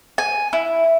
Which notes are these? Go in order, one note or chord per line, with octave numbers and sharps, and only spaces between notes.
G#5
E4